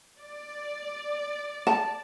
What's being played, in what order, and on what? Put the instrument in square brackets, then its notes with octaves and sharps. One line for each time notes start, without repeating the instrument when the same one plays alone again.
[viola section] D5
[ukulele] A5